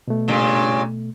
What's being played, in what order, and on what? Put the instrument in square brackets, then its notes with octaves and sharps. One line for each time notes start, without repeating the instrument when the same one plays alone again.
[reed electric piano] B2 A3
[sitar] G2 A#2 C#3